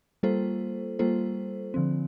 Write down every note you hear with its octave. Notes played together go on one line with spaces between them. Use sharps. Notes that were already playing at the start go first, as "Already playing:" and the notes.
G3 A#3 F4 A4 C5
G3 A#3 F4 A4 C5
D3 F3 C4